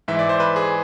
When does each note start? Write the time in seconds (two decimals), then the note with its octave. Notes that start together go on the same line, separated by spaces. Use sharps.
0.08 G#2 E3 E5
0.19 D5
0.29 C5
0.40 B4
0.56 G#4